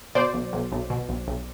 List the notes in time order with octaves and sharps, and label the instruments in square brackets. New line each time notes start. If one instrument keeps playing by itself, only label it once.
[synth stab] B2 C5 D5
B1
B1
B1
B2
B1
B1